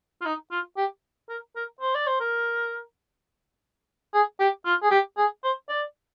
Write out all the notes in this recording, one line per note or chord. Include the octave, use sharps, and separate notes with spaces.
F4
D#4
F4
G4
A#4
A#4
C5
D5
C5
A#4
G#4
G4
F4
G#4
G4
G#4
C5
D5